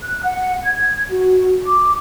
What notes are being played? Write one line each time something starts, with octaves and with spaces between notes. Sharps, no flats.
F#6
F#5
G#6
F#4
D6